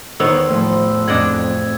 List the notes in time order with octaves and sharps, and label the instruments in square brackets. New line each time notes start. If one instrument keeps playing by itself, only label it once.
[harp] E2 C5 [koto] D#3 B3 C#5 [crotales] E6
[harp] A2 [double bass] F3
[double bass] F2 [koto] D4 D#5 F#5 [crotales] G#6